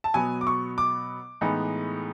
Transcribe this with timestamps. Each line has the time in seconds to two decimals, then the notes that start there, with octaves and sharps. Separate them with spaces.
0.04 A5
0.14 B2 F#3 B3 G#5
0.41 D6
0.47 C#6
0.78 D6
1.41 A2 E3 G#3 B3 D#4